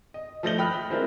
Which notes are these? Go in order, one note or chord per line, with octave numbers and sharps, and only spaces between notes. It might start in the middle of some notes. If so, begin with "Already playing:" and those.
D#5
F3 A3 C5 A#6 G7
G5 B5 D#6 F6 F#6
G#3 C4 E4 F4 A#4